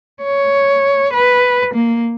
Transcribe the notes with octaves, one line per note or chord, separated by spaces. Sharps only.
C#5
B4
A#3